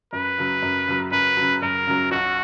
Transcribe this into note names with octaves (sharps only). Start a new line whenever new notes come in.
F#2 B4
C#3 F#3
F#2
C#3 F#3
F#2 B4
C#3 F#3
F#2 A#4
C#3 F#3
B1 F#4